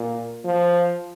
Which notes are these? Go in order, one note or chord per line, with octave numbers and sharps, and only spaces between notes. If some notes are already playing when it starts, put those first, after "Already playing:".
Already playing: A#2
F3